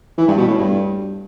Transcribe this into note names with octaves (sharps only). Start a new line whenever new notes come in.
E3
G2
B2
A2
G2